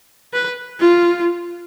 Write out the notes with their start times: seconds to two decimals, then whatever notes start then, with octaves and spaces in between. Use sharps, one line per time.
0.33 B4
0.80 F4